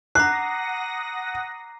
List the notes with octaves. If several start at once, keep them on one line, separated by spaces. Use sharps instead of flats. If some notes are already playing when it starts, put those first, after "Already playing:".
F#5 A#5 D6 D#6 F#6 A#6 C7